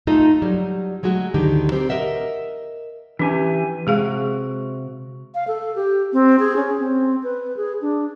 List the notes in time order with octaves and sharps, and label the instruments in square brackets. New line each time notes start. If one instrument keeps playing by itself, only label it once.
[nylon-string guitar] A3 D#4 F4 A4 D#5
F#3 G3
F#3 G#3 A3 F#4
D2 D3 D#3 G4
C4 G4 A#4
A#4 D#5 E5 F#5
[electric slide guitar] E3 G4 G#5 [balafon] C#4 D4
[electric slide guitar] C3 F#4 [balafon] G#3 G#4 F5
[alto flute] F5
A4
G4
C4
G#4
C#4
C4
B4
G#4
D4